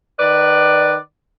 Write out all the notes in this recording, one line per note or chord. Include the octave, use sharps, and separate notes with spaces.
D#3 B4 D5